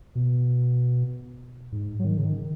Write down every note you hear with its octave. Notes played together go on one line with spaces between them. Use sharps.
B2
G#2
F#3
D#3
C#3
D#3